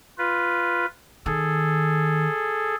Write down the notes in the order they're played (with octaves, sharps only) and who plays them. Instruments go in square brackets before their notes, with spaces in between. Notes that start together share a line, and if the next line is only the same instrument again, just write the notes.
[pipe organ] F4 B4
[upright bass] D#3 [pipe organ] G#4 A4